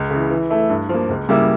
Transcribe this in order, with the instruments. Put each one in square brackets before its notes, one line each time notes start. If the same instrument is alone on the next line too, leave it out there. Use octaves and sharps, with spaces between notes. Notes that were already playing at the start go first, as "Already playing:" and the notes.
Already playing: [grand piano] C#2
C#3 E3
E3
A3 E4
G2
F3 A#3
C#2
C#3 G3 A#3 E4